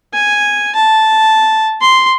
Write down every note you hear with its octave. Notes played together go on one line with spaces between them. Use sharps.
G#5
A5
C6